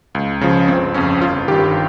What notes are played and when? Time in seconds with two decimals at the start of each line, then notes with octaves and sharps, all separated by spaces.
0.15 C#2
0.41 C#3 F3
0.68 G1 C4
0.94 F2 C#3 C#4
1.22 G1 F4
1.48 D#3 G4
1.51 G2